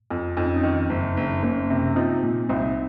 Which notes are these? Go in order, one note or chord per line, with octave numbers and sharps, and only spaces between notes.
F2
F2 D#4
C#4
C4 D#4
D#3
F#1
F#1
F#1 A#3 C#4
C3
F3 C4 D#4
A#2
C2 C4 D#4